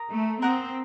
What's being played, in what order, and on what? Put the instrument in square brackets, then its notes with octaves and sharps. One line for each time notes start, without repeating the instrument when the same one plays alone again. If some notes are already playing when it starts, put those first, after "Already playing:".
Already playing: [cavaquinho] A#4 A#5 D#6
[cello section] A3
[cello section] C4 [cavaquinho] A#4 F#5 A#5 D#6